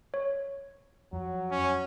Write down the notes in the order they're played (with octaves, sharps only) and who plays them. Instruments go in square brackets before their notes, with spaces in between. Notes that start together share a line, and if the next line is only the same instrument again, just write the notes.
[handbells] C#5
[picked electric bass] F2 [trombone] F#3
[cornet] C#4